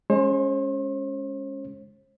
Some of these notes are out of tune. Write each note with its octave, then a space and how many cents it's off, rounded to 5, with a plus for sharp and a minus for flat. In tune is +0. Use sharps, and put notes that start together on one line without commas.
G#3 +5 C#4 +0 C5 +45